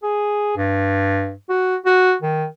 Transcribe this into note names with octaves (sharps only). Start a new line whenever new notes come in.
G#4
G2
F#4
F#4
D#3